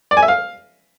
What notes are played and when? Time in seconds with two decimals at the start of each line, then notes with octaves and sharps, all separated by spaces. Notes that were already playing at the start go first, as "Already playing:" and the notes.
0.11 D5
0.17 G#5
0.23 E5
0.28 F5